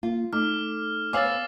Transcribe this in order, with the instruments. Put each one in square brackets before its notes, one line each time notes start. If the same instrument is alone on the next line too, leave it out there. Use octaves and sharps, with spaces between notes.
[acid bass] A#3 [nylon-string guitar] F4
[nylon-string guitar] A3 [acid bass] D#4 [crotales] D6 F6
[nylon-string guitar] B3 C5 C#5 [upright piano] F5 G#5 [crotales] D6 E6 A6